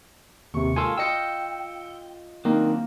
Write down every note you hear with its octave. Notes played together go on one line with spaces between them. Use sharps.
D#2 C3 C#6
G#2 A#3 F4 A4 G#5 C6 E6
F4 D#5 G5 E6 G6 C#7
D#3 F#3 A#3 C4 D4